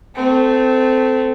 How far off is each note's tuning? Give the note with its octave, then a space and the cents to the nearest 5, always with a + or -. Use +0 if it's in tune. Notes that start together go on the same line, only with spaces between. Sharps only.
A3 +0 C4 -15